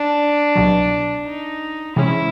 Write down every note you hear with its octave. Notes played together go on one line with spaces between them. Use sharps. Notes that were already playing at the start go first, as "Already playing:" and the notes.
Already playing: D4
C2 B2 F#3
D#4
C3 E3 G#3 C#4 E4